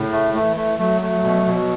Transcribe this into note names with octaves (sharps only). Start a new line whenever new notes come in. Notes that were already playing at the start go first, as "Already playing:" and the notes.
Already playing: A2 C#3
A3
E3 A3
A3
F#3 A3
A3
B2
B2